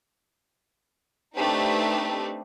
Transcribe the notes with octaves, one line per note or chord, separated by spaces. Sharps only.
A3 C4 D4 D#4 G4 B4